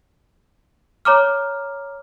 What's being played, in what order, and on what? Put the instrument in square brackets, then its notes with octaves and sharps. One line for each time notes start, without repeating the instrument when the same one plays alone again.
[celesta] C#5 A#5 D6 F6